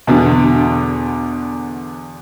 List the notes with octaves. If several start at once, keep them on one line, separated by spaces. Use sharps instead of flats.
E2 B2 D3